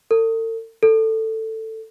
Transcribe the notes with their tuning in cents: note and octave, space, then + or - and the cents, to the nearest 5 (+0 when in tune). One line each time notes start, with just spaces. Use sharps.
A4 +45
A4 +10